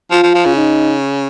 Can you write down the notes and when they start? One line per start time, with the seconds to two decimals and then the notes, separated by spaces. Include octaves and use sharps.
0.11 F3 F4
0.23 F3
0.35 F3
0.46 C#3
0.56 D#4